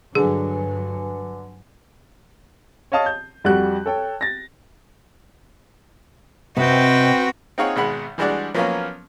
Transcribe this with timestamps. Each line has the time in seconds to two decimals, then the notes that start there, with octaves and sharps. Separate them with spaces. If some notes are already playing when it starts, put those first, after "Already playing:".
0.15 G2 D3 F#3 G#4 B4 G#5
2.92 C#5 D#5 F5 A5 D#6
3.06 G6
3.44 F2 G3 F#4 G4 F#6
3.86 A4 C#5 G5
4.21 A6 A#6
6.57 C3 C4 F#4 B4 D#5 G5
7.58 C4 D#4 F4 G#4 C#5 F#5
7.76 G#1 B2 G#3 F#5 B5
8.18 E3 G3 G#3 D4 F#4 D5
8.54 F3 F#3 A#3 B3 C#4 F4